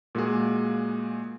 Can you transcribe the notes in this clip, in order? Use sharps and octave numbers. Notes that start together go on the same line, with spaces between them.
A#2 G#3 A#3 F#4 G#4